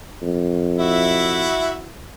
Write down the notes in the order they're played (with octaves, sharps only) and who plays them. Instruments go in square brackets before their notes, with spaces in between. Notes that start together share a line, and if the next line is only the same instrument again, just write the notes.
[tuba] F2
[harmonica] E4 F#4 E5